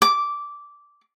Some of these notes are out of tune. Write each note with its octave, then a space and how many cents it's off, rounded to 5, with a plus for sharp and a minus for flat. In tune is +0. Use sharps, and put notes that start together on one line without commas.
D6 -10